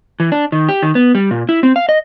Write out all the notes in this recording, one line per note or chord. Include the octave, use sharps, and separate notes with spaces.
E3
D4
D#3
G4
D#3
B3
G3
A#2
E4
C4
F5
D#5